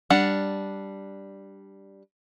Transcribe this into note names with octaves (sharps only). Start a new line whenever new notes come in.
G3 D4 F#5